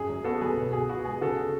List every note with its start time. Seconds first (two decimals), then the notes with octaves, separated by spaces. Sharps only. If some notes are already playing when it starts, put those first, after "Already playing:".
Already playing: F#2 G#4
0.10 F#3
0.24 B3 F#4 A4
0.41 F#3 G#4 B4
0.57 B2
0.73 B2 G#4
0.89 B3 F#4
1.05 G#3 G#4
1.21 C#3 F#4 A4